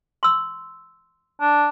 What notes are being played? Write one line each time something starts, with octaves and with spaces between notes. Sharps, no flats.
C6 E6
D4